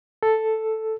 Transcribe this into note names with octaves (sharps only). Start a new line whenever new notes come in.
A4